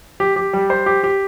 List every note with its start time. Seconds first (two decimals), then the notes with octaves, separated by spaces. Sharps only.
0.20 G4
0.36 G4
0.53 G3
0.70 C5
0.86 G4
1.04 G4